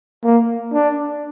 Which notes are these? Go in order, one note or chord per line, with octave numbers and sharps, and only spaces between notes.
A#3
D4